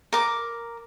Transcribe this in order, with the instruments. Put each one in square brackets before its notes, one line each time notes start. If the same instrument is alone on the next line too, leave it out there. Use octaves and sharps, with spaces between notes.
[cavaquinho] A#4 D6